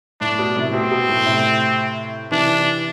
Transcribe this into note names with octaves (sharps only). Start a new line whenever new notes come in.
A2 D4
B2
A2 C3
B2 C4
B2
A2
A2 C3
C3 E3 D4